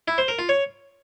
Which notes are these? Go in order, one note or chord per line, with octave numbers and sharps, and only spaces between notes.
E4
C5
A#4
F4
C#5